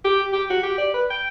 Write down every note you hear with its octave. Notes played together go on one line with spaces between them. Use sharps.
G4
G4
F#4
G4
D5
B4
G5